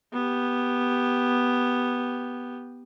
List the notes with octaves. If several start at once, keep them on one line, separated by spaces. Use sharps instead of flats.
B3 G4